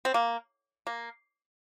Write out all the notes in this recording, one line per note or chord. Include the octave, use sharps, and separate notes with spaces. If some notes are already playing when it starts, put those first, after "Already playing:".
C4
A#3
A#3